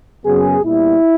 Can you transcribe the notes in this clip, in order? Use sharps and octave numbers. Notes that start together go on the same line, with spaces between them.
F#2 C#3 F#3 B3 G#4
A#2 G3 B3 E4